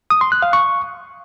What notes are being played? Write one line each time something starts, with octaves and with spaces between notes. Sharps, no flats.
D#6
C6
F#6
F5
C#6